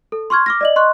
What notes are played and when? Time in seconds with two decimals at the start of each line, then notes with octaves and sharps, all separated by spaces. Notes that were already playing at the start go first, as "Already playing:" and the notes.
0.12 A4
0.30 C6 C#6 F6 G#6
0.46 D6 F6 A#6
0.61 D5 D#5 F#7
0.76 D#5 C6 C#6 F#6